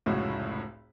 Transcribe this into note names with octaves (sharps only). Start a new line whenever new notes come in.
F1 C#2 A2 F#4 C#5